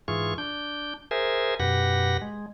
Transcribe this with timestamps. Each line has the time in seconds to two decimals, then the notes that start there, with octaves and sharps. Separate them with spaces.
0.08 G#2 E3 F4 G#4 C#6
0.38 D4 G6
1.11 G#4 A#4 C5 E5 G#5
1.60 F#2 B2 G4 B4 F#5 A#6
2.22 G#3